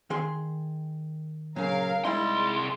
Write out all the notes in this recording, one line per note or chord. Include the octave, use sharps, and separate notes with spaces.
D#3 G#4 C6
A#2 C#3 F#3 A#4 F5
C2 G3 G#3 D#4 E4 C6